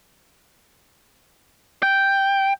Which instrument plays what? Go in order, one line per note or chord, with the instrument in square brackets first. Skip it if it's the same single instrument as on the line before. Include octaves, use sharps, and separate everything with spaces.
[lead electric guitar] G5